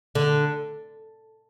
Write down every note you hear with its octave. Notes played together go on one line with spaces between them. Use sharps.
D3